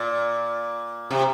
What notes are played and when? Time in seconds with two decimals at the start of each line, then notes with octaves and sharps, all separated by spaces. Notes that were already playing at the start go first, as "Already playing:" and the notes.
Already playing: A#2
1.11 C3